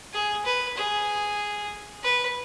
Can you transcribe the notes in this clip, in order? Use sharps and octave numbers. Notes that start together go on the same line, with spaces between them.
G#4
B4
G#4
B4